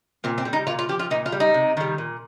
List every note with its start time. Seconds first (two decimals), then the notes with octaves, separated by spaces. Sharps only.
0.24 A#2 C4
0.38 C4
0.45 G3
0.53 D#4
0.67 A#2 F4
0.79 F4
0.89 F3 G4
0.99 F4
1.11 A#2 D#4
1.26 F4
1.32 G3
1.40 D#4
1.54 C3
1.77 D#3 G3
1.98 A#2